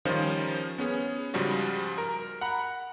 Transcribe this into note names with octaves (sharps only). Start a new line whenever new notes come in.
D#3 F3 G3 C#4 F4 C5
B3 C#4 G#4
G#2 C#3 F3 G3 F#4
A#4
F#5 A#5 B5